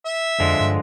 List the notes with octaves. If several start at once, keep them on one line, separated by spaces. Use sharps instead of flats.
E5
F2 D3 F3 G#3
G2